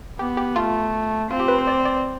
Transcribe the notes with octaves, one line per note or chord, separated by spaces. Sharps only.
B3 G4
G4
A3 F4
C4 F4
G4
B4
C5
D5
D5